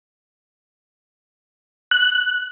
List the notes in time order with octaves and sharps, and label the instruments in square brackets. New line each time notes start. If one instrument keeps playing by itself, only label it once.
[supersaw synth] F#6